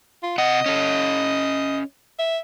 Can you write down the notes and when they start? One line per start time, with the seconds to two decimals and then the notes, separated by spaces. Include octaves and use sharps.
0.23 F4
0.38 C3 D#5 F#5
0.66 C#4 A4
2.19 E5